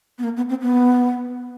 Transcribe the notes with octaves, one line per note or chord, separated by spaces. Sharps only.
B3
A#3
B3
C4
B3